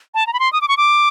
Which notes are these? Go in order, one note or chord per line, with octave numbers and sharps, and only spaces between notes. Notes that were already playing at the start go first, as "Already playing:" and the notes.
A5
A#5
B5
C6
D#6
D6
C#6
D6